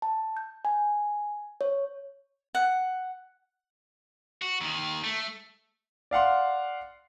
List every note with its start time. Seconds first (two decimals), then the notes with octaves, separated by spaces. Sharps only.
0.02 A5
0.37 G6
0.65 G#5
1.61 C#5
2.55 F#5
4.42 F#4
4.61 D#2 D#3
5.04 A3
6.11 D5 F5 F#5 C6